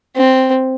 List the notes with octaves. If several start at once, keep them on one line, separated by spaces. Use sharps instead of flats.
C4